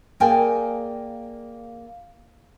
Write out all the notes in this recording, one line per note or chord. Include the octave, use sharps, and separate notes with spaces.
A#3 G#4 A#4 D5 G5 G#5